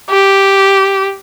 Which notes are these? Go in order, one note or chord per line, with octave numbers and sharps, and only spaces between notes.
G4